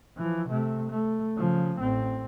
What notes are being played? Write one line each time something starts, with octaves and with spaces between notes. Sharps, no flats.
E3 F3
C3 A3
A3
C#3 F3
A1 C4